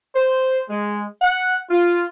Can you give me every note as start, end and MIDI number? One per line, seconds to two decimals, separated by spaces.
0.15 0.60 72
0.70 1.04 56
1.22 1.56 78
1.71 2.05 65